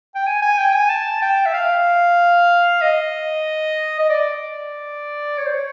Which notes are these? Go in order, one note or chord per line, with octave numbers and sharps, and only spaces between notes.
G5
G#5
G#5
G5
G#5
A5
G5
E5
F5
D#5
D#5
D5
C#5
C5
C#5